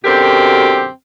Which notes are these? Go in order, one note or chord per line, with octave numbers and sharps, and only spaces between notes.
F#2 B2 D3 C4 G4 A#4